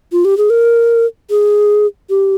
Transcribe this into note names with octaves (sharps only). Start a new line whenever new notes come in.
F4
G4
G#4
A#4
G#4
G4